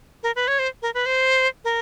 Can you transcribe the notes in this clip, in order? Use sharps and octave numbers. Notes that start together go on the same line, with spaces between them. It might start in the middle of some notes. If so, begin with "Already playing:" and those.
A#4
B4
C#5
C5
A#4
B4
C5
A#4